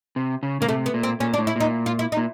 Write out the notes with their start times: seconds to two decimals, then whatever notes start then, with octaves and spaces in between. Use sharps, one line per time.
0.16 C3
0.43 C#3
0.61 C#3 A#3
0.68 C3 A3
0.86 B3
0.94 A#2
1.03 C4
1.20 A#2 C#4
1.34 D4
1.38 A2
1.47 E4
1.56 A#2 D#4
1.86 F4
1.99 E4
2.12 D#4
2.17 A#2